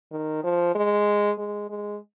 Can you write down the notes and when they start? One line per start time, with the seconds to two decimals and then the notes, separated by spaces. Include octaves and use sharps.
0.12 D#3
0.44 F3
0.75 G#3
1.38 G#3
1.70 G#3